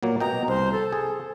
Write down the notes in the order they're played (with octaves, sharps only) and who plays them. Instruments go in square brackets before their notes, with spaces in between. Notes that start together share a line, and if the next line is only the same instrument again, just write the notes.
[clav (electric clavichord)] A#2 F#3 A#3
[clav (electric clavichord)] B2 D#5 G5 [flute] A#5
[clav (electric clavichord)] C2 [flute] C5
[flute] A4
[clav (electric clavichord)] G#4